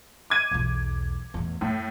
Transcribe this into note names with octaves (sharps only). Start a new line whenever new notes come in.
D6 G#6 D#7
B1 E2
A1 E2
F#2 A2